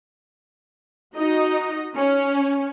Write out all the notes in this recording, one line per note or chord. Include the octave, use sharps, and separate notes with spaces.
D#4 F#4 D#5
C#4